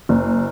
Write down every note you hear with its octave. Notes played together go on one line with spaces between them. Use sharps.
F#1